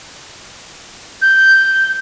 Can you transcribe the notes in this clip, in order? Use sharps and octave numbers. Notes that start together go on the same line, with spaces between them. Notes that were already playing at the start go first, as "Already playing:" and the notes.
G6